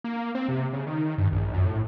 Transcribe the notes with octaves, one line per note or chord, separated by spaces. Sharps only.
A#3
C4
C3
C#3
D#3
G2
A#1
F#2
A2